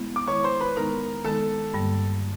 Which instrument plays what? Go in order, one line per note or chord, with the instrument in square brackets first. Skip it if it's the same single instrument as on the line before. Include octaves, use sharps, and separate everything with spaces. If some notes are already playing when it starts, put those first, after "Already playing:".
Already playing: [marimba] G#3 B3 E4
[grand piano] D6
[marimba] D#3 G#3 B3 E4 [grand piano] C#5 C#6
[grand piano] C5 C6
B4 B5
[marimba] D#3 G#3 B3 D#4 [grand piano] A#4 A#5
[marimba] D#3 G#3 B3 D#4 [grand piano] A4 A5
[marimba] G2 D3 G3 A#3